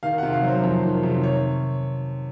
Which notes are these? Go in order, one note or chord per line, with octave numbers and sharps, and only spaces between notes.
D#3 F5
C3 F#5
F5
F#3
C5
F2
D#3
C3
C#5